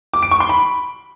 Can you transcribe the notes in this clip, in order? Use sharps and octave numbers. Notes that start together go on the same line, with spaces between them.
D6
D7
C#6
C6
B5